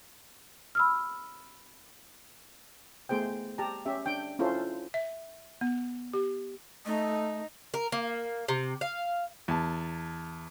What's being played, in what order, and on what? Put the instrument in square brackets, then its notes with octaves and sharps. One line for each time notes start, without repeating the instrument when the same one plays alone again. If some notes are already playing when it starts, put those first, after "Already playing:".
[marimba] B5 E6 F6
[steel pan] A3 B3 G#4 C5 G5
G4 A5 A#5
C#4 G4 E5
D4 G5
C#4 E4 F4 A4 C5
[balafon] E5
B3
G4
[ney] A3 [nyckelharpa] D#4
[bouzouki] A#4
A#3
C3
F5
[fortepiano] E2 A5